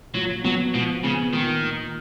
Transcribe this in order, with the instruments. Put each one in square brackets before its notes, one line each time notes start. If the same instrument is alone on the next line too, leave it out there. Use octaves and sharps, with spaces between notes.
[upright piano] A#2 [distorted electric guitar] F#3
[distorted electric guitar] F#3 [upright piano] B3
[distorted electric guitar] B2 [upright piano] F3
[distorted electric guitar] C#3 [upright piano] B3
[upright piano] A#2 [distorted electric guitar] D#3
[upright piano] A#2